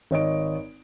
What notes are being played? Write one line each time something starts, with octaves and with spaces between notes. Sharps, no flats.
G#1 C#5 D#5 D7